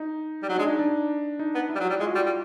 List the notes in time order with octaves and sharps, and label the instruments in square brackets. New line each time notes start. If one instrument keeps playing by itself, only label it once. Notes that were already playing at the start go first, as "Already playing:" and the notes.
Already playing: [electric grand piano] D#4
[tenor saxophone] G3
[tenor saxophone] F#3 [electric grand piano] D#4
[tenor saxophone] G#3 [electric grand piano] D4
[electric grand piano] D#4
D4
D#4
[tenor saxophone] B3
[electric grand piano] E4
[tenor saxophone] G3
F#3
G3
[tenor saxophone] G#3 [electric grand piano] F4
[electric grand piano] F#4
[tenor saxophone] G3 [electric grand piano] F4
[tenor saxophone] G3